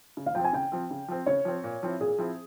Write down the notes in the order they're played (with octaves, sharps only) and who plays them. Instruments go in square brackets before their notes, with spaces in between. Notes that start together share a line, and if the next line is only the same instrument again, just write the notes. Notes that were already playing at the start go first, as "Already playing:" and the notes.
[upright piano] C#3
[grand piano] F5
[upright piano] F3 C4 [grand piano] G5
[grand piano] G#5
[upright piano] C#3 [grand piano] G5
[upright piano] F3 C4
C#3
F3 C4
[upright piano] C#3 [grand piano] C#5
[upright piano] F3 C4
A#2
F3 C4 E4
[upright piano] A#2 [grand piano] G#4
[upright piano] F3 C4 E4